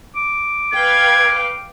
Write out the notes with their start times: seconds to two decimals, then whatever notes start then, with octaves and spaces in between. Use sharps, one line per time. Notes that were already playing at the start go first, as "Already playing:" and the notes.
0.16 D6
0.74 B4 F5 G5 G#6